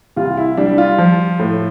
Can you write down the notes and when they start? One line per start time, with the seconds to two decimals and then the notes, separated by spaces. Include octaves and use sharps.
0.16 C2 F4
0.37 E4
0.57 G3 D4
0.78 F4
0.98 F3
1.40 A2